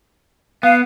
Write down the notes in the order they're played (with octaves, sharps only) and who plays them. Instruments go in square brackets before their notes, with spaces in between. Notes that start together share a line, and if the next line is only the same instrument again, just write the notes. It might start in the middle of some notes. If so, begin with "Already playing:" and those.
[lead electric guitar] B3 [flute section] F5